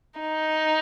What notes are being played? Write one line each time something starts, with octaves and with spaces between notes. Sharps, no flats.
D#4